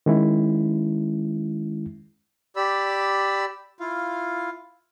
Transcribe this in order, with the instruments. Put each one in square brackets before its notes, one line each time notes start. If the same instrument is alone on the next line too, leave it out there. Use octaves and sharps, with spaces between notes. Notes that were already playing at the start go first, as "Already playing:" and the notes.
[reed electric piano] D#3 G#3 C#4 E4
[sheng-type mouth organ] G4 D5 B5 E6
E4 F4 F5